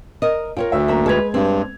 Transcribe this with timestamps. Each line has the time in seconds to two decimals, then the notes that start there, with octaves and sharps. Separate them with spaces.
0.22 A#4 D#5
0.57 F4 A#4 C#5 G5
0.72 D2 E5
0.88 F#2 A#3 E5 A#5
1.06 G#3 A4 B4 G#6 F7
1.34 G2 C4